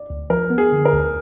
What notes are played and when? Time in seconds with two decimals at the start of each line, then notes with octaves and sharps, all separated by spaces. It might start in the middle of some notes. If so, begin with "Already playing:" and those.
Already playing: D5
0.10 D2
0.30 F3 A#4
0.50 B3
0.58 G#4
0.72 D3
0.85 A#4
0.93 D2